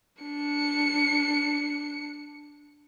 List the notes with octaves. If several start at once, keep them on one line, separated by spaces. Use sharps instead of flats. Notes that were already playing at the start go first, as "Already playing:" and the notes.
D4 C#7